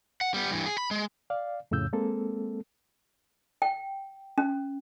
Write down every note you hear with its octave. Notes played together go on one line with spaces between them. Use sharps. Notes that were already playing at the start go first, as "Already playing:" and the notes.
F#5
G3 B3
G2 E3
G#4
B5
G#3
D5 F5
F2 A2 C#3 E6 G6
G#3 A#3 C4 A4
G5
C#4